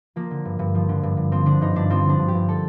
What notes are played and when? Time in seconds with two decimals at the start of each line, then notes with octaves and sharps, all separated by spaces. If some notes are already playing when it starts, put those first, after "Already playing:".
0.16 F3 A#3
0.31 D3
0.45 G2
0.59 G2
0.75 F3
0.89 D3
1.03 G2
1.17 G2
1.32 F3 C4
1.46 D3 D4
1.61 G2 D#4
1.76 G2 D4
1.90 F3 C4
2.05 D3 D4
2.19 G2
2.28 G4
2.34 G2
2.49 A4